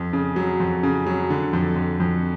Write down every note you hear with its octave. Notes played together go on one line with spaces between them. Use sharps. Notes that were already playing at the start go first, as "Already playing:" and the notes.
Already playing: F2
C#3
F#3
F2
C#3
F#3
D3
F2
F2
F2